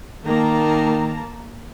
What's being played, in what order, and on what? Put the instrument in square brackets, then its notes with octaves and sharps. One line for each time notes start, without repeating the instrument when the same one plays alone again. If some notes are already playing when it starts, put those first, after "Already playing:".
[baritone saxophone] D#3 [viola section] A#3 A5 A#5